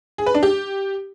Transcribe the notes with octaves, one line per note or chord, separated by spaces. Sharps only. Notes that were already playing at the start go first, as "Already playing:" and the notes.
G#4
B4
D4
G4